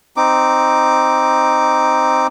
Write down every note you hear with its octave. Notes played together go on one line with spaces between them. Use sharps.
C4 D#4 D6